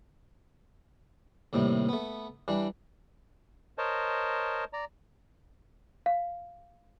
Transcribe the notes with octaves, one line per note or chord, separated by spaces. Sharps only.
D#2 A2 C3 G3
A3 B3
E3 G3 D4
A#4 C5 C#5 D#5 A5
D5 A#5
F5